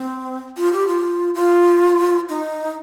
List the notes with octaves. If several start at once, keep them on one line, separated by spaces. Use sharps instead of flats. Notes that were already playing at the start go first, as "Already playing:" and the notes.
Already playing: C4
F4
G4
F4
F4
D#4